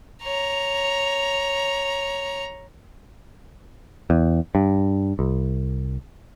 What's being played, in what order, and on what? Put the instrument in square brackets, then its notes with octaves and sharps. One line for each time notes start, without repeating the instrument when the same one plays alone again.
[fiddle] C#5 A#5
[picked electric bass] E2
G2
C2